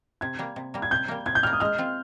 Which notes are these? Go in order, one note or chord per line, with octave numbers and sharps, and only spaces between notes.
C3 G#6
G3 A#3
C3
G3 A#3
G#6
C3 G6
G3 A#3
C3 G#6
G6
G3 A#3 F6
D#6
G#3 F6
C4 F4